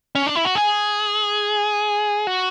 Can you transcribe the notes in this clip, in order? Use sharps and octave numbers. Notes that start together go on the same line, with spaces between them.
C#4
D4
E4
F#4
G#4
F#4